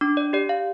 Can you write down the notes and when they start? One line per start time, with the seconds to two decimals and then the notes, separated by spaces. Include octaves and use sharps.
0.01 D4 D6
0.17 D5
0.33 G4 D5
0.49 F5